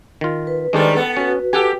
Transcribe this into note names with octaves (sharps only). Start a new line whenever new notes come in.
D#3 F4
B4
D#3 G3 G#3 D4 A4 C5
B3 A4
C#4 F#4 B4
G4 A4 F#5 G#5